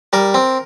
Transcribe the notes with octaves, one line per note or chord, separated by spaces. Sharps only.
G3 A#4
C4